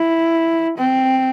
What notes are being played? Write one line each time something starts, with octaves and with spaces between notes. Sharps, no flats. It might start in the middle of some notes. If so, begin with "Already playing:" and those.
Already playing: E4
C4